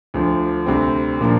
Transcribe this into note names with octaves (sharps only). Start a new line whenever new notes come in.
D2 D3 F3
D2 C3 G3 C4
A#2 F3 A#3 D4